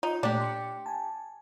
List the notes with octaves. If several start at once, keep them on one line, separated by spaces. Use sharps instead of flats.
D#4 F4 D#5
A#2 A3 D4 G4
C6 C#7
G#5 A5